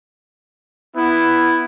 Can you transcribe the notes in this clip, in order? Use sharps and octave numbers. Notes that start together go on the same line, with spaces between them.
B3 E4